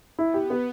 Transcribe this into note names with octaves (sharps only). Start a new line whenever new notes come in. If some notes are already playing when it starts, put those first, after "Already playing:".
B3 E4
G4
B3